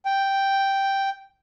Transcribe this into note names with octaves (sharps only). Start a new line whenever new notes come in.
G5